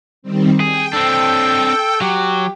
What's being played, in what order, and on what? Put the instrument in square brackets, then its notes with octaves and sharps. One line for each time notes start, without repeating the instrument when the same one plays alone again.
[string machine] D#3 G3 C4
[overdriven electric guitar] G#4 [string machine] G5
[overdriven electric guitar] C4 D4 [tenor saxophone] A4
[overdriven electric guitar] F#3 [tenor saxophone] G4